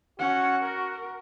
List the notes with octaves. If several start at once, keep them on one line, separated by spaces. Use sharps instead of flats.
C#4 F#4 F#5
A#4